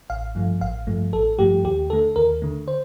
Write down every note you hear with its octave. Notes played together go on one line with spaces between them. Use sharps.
A1 F5
G2 F3 A3
A1 F5
G2 F3 A3
A1 A4
G2 F3 A3 G4
D#2 G4
D3 A3 A4
D#2 A#4
D3 A3
C5